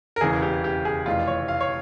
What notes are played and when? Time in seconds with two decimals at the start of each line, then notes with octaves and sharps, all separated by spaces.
0.16 A#4
0.21 E1 E2 C#3 E3 G#4
0.42 G4
0.64 G4
0.85 G#4
1.06 F1 F2 E3 F4
1.27 C#5
1.48 F5
1.60 C#5